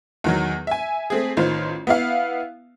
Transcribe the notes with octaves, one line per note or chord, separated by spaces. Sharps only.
E2 D#3 F#3
E5 G#5
A3 C4 G#4
A1 D#3 F4 C5
B3 E4 F5